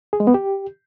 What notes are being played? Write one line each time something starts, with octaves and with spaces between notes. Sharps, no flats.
G#4
G#3
B3
G4